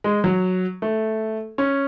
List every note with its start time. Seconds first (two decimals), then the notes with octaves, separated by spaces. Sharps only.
0.04 G#3
0.24 F#3
0.82 A3
1.58 C#4